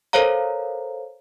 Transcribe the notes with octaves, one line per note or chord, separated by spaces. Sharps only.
A4 A#4 C5 C#5 F5 A#5